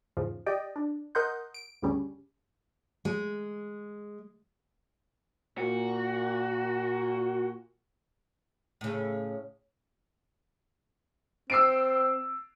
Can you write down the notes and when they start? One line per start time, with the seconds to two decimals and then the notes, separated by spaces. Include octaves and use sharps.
0.17 E2 G#2 C#3 F3
0.46 G4 D5 D#5 G5
0.76 D4
1.15 A#4 D#5 F#5 C6 G6
1.54 D7
1.82 D2 G2 C#3 G3 C#4
3.05 G#3
5.58 A#2 F#4
8.81 A2 C#3
11.50 C4 E6 C7 D7